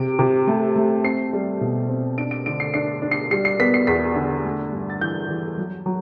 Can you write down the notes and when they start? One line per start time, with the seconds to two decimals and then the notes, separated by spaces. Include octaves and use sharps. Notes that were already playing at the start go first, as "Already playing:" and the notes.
Already playing: C3 D7
0.19 C3
0.47 A3
0.76 A3
1.04 C4 C7
1.33 G3
1.61 B2
1.89 C4
2.18 D4 D7
2.31 D7
2.46 D3 D7
2.60 C7
2.74 D4 C7
3.02 D4
3.11 C7
3.31 G3 C7
3.45 C7
3.60 B3 B6
3.74 C7
3.87 E2 B6
4.16 D3
4.44 A3
4.72 G2
4.90 A6
5.01 E3 G6
5.29 E3
5.58 F#3
5.86 F#3